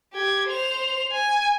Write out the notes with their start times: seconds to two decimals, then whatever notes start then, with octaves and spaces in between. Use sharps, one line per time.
0.14 G4 G#6
0.48 C5 F7
1.12 G#5